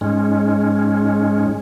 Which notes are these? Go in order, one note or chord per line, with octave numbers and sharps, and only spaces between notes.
G#2 G#3 C#4